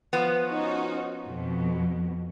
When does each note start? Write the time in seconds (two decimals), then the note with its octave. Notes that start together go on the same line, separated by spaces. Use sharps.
0.13 F3 B3
0.48 C#4 D#4 F#4
1.26 F2 B2